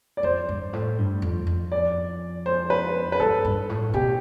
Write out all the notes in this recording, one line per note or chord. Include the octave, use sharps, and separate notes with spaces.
D5
F2 C5
G2
A2
G2
F2
F2
D5
C5
B4
B4
G2 A4
G2
A2
B2 G4